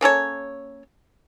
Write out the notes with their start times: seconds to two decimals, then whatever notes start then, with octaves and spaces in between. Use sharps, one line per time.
0.01 A#3 C#4 A4 C#5